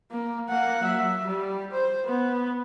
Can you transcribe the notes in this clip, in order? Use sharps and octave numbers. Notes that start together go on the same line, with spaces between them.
A#3
A#3 F#5
F#3 E5
G3 G4
C5
B3